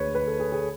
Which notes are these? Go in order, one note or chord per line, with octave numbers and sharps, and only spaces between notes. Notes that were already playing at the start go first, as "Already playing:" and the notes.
Already playing: D2 G#3 B4 C#5
B4
A4
G#4
G#4